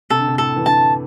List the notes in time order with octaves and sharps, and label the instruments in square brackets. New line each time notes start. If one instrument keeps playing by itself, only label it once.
[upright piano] C3 [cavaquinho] A4
[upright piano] D3
C3
[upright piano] A2 [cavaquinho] A4
[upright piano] E3
[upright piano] D3 [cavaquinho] A5